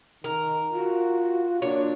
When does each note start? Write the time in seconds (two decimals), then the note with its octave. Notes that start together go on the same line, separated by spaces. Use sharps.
0.24 D#3 A#4
0.73 F4 F#4
1.62 A#2 D4 C#5